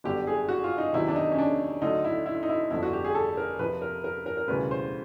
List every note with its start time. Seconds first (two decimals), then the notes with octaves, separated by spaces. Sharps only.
0.04 G1 F#2 D3 G4
0.27 G#4
0.49 F#4
0.64 F4
0.78 D#4
0.93 E2 C3 D#3 F#3 E4
1.08 D4
1.16 D#4
1.32 C#4
1.38 D4
1.82 D2 D3 F#3 D#4
2.05 E4
2.26 E4
2.43 D#4
2.49 E4
2.71 G1 F2 D3 F3 E4
2.83 F#4
2.93 G4
3.04 G#4
3.15 A4
3.37 A#4
3.59 F2 C3 F3 B4
3.82 A#4
4.04 A#4
4.26 A#4
4.37 A#4
4.48 E1 D2 C#3 E3 G3 B4
4.71 C5